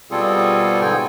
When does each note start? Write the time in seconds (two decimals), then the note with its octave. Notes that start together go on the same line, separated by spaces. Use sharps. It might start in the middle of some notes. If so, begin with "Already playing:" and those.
0.11 B2 G3 C4 F4 G#4 A4
0.81 G#2 D3 B3 G5 G#5